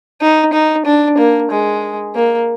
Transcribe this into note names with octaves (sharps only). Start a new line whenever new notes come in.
D#4
D#4
D4
A#3
G#3
A#3